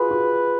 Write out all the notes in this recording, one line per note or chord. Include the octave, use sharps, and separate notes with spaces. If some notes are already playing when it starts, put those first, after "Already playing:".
Already playing: F4 F#4 G#4 B4
F#4